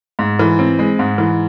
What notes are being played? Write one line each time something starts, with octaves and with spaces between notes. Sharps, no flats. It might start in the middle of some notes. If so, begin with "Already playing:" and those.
G#2
E3
C4
G#3
G#2
E3